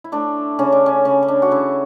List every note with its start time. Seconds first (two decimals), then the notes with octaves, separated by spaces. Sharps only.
0.04 E4
0.12 A3 D4
0.59 C#3 C#4
0.72 D4
0.86 C#4
1.05 C#3 C#4
1.23 C#4
1.28 D4
1.42 F#4
1.51 C#3 E4